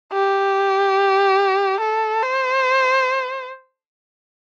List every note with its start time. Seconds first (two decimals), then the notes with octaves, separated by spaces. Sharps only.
0.13 G4
1.81 A4
2.23 C5